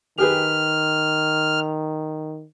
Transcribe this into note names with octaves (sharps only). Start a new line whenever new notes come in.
D#3 G4 G#4 B4 F6